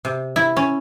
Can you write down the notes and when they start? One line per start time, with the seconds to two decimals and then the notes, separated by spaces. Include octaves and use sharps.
0.05 C3
0.36 E4
0.57 C#4